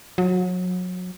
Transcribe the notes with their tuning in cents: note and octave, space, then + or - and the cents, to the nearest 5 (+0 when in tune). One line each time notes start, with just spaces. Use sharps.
F#3 -30